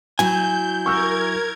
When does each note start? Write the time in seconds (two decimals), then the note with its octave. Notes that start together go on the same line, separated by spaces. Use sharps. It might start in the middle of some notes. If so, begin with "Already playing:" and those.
0.19 F#3 E4 G#5 G6
0.86 A#4 C#6 E6 G6 G#6